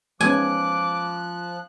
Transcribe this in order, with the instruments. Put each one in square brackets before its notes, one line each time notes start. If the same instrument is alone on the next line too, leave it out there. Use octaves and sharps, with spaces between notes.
[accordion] F3 F#6 [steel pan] G#3 B3 C#4 [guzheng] G#5 [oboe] D6